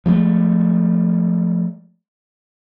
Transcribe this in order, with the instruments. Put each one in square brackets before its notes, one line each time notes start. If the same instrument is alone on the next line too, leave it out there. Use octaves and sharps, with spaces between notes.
[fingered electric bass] F3 G#3 A3